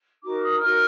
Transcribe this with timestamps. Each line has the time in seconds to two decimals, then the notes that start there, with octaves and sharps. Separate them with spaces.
0.23 D#4 F#4 A#4 D6
0.41 D#6
0.60 D#4 F#4 A#4 F6